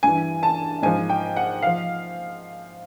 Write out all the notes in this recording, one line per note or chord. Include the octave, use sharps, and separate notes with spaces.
G2 E3 G#5
A5
G#2 F3 G#5
G5
F#5
F3 F5